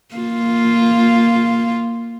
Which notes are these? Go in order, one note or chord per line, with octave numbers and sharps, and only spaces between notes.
A#3 F4